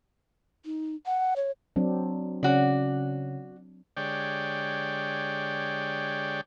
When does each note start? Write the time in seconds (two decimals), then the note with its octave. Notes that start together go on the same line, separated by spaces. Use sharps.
0.65 D#4
1.07 F#5
1.36 C#5
1.76 F#3 C4 D4
2.43 C#3 C#4 F#4 D5
3.97 D3 G#3 G4 C#5 D5 G5